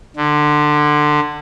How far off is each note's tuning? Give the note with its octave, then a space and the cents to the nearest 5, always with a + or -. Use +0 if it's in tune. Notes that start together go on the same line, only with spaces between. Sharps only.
D3 +20